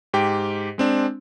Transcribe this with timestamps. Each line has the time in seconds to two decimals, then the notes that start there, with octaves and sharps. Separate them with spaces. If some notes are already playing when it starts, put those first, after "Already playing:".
0.13 G#2 G4 G5
0.78 G#3 C4 D4